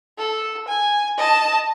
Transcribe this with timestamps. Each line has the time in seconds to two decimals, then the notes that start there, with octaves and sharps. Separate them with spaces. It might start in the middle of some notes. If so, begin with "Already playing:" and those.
0.18 A4
0.68 G#5
1.18 D#5 A5